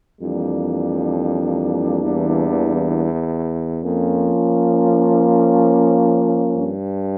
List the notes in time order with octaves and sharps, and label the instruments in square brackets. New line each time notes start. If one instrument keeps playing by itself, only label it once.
[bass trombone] F2 [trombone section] E3 G3 A#3 D4
[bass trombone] E2
[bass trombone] F2 [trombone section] F3 A#3 C#4
[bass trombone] G2